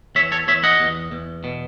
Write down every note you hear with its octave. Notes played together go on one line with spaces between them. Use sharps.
E2 C#5 E5
A4 C#5
E2 C#5 E5
D#5 F#5
E2
E2
B2